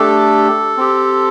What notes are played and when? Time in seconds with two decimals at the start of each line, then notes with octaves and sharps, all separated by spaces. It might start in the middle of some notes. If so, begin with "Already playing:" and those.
Already playing: A3 D4 G4 A4
0.77 C4 G4